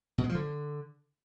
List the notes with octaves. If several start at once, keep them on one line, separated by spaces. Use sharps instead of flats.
B2
G#3
F3
D3